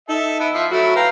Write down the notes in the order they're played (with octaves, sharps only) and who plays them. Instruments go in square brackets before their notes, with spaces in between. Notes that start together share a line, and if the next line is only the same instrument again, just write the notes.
[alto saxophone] D#4 [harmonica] A4 E5
[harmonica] B3 E4
F3 E5
[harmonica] F#3 A3 E4 [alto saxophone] F#4
[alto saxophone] B4 [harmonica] F5 G5 A#5